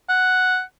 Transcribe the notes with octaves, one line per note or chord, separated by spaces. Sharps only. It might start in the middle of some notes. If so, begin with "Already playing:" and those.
F#5